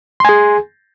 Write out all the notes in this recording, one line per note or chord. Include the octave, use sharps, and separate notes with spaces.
G#4 G#5 C6